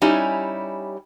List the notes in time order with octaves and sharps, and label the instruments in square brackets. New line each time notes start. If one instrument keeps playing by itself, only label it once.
[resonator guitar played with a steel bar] G3 C#4 D#4 E4 G4 G#5